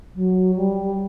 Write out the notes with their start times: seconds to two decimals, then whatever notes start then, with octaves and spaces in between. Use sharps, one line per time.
0.15 F#3
0.56 G3